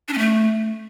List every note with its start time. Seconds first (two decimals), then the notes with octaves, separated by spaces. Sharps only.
0.08 D4
0.13 C#4
0.18 A3